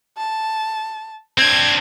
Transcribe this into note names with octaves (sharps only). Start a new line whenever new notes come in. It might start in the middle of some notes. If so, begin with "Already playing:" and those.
A5
C4 D4 G#6